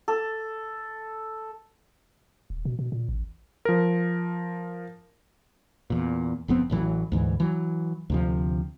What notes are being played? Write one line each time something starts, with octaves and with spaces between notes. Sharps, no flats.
A4
D#1
B2
B2
A#2
A1
F3 A#4
E2 A#2
F#1 F2 B3 C4
A1 A2 E3 F#3
D2 G#2 E3
E3 F#3
D2 C3 F3